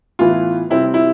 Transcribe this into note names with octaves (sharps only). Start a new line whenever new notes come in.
A2 E3 B3 F4
C3 G3 C4 E4
E4